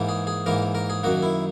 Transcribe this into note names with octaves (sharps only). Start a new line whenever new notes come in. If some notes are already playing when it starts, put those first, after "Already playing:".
Already playing: G#2 E3 A#3
G#4
G#4
G#2 E3 A#3 A#4
A#4
G#4
F#2 D#3 A#3 F#4
E4